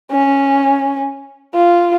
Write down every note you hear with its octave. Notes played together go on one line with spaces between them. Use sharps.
C#4
F4